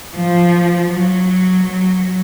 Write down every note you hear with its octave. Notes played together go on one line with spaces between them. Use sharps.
F3
F#3
F#3